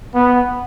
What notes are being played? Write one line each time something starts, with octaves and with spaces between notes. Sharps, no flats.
B3